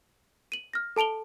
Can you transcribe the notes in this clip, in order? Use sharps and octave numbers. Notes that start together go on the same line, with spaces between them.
D#7 F#7
F6 A#6
A4 A5 D7 F7 G7